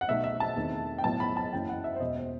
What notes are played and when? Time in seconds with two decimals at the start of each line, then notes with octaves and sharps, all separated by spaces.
0.01 F#5
0.08 B1 B2 A3 D#4 E5
0.24 E5
0.40 A5
0.56 E2 D#3 A3 C4
0.98 G5
1.04 B1 A2 F#3 B3 A5
1.20 B5
1.37 A5
1.53 F#1 F#2 E3 G5
1.69 F#5
1.84 E5
1.96 C5
2.00 E1 E2 B2 D#5
2.16 C5